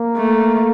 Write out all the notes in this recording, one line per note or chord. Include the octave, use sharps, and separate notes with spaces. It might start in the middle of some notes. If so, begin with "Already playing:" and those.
Already playing: A#3
A3